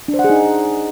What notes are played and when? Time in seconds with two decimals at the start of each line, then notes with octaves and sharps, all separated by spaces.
0.08 D4
0.14 C5
0.19 F#5
0.24 G#4
0.30 D#4